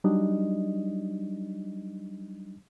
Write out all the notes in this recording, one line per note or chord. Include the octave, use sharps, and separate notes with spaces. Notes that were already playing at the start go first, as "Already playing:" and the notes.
F#3 G3 D4 D#4 D#5